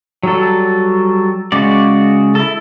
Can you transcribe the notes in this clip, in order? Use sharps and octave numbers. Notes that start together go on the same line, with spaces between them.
F#3 G3 A4
C#3 G#3 F#4 D5
E4 A4